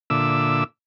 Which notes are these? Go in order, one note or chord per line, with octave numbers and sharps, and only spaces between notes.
A#2 D3 E5 D6 E6